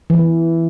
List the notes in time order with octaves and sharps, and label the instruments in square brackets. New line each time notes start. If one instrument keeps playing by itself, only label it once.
[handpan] E3